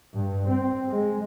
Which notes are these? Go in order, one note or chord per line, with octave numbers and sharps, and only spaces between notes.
G2
C4
G#3